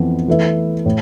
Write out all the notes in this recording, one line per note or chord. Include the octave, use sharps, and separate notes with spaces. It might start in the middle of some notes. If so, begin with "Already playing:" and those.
Already playing: F2 E3 B3
E3 A3 E4 B4 E5
A2